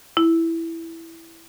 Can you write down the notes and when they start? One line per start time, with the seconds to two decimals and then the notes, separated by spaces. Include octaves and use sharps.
0.17 E4